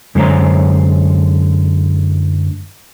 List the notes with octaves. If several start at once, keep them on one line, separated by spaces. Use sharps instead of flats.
F#2 D3 G#3 C5 C#5 A#5